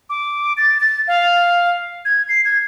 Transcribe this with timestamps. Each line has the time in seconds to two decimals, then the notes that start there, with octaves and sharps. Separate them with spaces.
0.10 D6
0.57 A6
0.80 A6
1.08 F5
2.05 G#6
2.29 C7
2.45 G#6